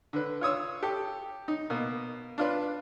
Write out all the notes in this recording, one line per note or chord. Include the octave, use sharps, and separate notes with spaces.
D3 B4
F4 C#5 D#6 E6
G4 A4
D#4
B2 A#3
D4 F4 B4